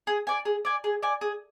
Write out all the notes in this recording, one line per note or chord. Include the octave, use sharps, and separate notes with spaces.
G#4
D5 G#5
G#4
D5 G#5
G#4
D5 G#5
G#4